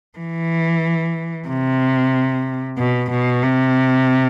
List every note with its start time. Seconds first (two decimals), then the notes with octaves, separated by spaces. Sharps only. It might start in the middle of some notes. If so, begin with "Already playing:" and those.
0.19 E3
1.48 C3
2.78 B2
3.11 B2
3.43 C3